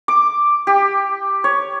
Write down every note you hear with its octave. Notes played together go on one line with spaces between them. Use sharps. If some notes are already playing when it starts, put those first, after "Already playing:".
D6
G4
C#5